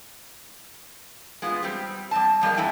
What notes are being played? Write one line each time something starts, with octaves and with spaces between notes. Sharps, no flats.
G#3 B3 F4
G3 C4 G4
G3 C4 A5
F2 G3 G#3 A#3
F2 A3 E4 G5 G#5